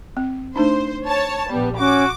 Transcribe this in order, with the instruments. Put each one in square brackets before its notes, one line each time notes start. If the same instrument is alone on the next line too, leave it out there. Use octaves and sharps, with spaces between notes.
[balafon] C4
[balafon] A3 D4 D#4 [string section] C5
[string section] C#5 A5
[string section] A#1 G3 [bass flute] B3
[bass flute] C#4 [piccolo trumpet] F#4 [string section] D6